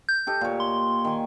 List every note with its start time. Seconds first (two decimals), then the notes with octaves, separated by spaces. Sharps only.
0.09 G6
0.27 G4 A4 D#5
0.41 A#2 C#5
0.60 C6
1.05 D#3 G#5